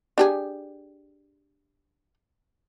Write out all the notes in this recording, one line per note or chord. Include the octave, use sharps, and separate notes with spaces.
D4 G4 G#4